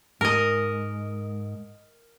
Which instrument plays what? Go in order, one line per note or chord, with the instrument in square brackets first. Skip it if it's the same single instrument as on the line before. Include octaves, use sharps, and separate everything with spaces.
[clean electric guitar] G#2 [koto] A#4 D#5